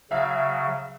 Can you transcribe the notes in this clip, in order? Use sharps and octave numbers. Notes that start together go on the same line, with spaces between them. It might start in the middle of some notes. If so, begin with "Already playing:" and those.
C#3 F#3 E5 F5